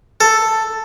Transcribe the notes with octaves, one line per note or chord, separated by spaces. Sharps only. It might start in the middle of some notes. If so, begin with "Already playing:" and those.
A4